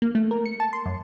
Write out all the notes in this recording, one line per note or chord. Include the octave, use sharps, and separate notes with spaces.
A#3
A3
A#4
C#7
A5
C6
F#2